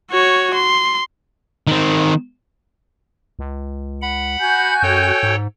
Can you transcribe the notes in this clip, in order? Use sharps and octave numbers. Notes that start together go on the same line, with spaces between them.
F#4 C#5
C6
D#3 C4
C#2
F#5 B5
F#4 G#5 G6
F#2 A4 C#5 G5
G#2